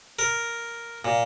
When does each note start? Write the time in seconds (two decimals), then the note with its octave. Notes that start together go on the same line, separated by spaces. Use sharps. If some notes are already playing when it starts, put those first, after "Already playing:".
0.19 A#4
1.05 A#2